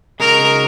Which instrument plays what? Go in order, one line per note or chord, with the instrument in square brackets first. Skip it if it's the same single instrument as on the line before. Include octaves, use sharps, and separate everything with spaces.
[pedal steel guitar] C#3 G#3 D#4 F#4 [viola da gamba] A#4